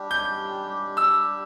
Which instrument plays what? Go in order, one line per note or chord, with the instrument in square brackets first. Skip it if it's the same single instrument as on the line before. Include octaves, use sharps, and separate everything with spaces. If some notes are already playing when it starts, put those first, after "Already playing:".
Already playing: [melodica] G3 D4 G4
[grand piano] G6
E6